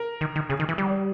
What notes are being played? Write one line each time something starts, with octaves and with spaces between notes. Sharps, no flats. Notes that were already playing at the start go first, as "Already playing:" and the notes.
Already playing: A#4
D#3
D#3
C#3 G#4
D#3
E3
G3